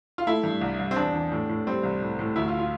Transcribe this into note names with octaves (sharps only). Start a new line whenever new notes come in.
F4
A3 E4
G2
C2
C2
C4
E2 D4
E2
A2
A2
G3 C4
C2
A2
A2
D2 E4
F4
F4